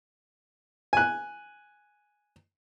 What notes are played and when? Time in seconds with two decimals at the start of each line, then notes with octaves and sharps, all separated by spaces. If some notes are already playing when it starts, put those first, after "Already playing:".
0.93 G#5 F#6